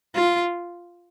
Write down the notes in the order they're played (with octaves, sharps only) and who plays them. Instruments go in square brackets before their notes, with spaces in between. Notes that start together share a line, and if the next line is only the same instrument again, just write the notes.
[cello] F4